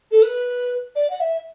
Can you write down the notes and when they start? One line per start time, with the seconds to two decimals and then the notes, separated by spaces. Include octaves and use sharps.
0.11 A4
0.23 B4
0.96 D5
1.10 F#5
1.20 E5